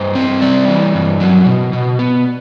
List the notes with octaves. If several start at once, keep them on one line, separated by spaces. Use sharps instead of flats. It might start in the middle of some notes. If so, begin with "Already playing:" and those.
Already playing: G2 C5
C4
G3 D5
E3
G2
F#3
B2
B2
B3